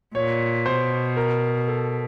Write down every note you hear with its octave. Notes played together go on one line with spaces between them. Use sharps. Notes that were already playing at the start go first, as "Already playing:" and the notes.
A#2 C#5
B2 C5
A#4
A4